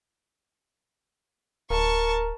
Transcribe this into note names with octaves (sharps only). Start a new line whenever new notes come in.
D1 A#4 A5 C#6